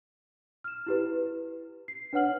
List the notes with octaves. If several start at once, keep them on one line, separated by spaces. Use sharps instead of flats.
F6 E7
E4 G4 B4
C7
D4 B4 C#5 F#5 F6 F#7